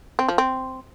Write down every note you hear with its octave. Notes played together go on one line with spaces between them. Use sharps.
C4
F3
C4